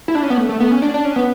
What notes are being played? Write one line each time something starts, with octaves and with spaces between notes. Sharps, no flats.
E4
D4
C#4
B3
A3
A3
B3
C#4
D4
D4
C#4
B3